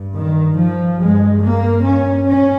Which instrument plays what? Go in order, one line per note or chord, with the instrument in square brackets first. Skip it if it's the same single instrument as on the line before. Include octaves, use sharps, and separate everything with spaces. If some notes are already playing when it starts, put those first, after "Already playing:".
Already playing: [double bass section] G2
D#3
F3
G2 G#3
A#3
C#4
C#4